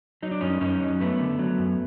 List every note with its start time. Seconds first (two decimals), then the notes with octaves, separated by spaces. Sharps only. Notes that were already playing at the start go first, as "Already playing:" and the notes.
0.22 F#3 D#4
0.31 D4
0.41 F#2 C#4 D#4
0.61 F#2 C#4 D#4
0.81 F#3
1.00 F#2 A3 B3
1.20 D3
1.39 F#3
1.58 F#2